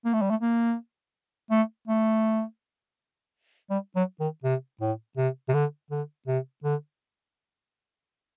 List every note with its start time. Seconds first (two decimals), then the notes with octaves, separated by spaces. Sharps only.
0.05 A#3
0.13 A3
0.22 G3
0.30 A3
0.41 A#3
1.51 A3
1.87 A3
3.70 G3
3.96 F#3
4.20 D#3
4.44 C3
4.81 A2
5.17 C3
5.48 C3
5.54 D3
5.91 D3
6.27 C3
6.64 D3